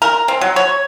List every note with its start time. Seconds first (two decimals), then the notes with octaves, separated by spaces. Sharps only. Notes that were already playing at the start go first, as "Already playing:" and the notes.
0.02 A#4
0.28 C4
0.41 F#3
0.56 C#5